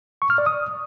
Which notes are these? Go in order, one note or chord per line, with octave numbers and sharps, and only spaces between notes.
C#6
F6
D5
D#6